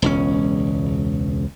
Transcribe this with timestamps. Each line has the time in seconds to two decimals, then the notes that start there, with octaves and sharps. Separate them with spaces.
0.02 E1 C#2 C#4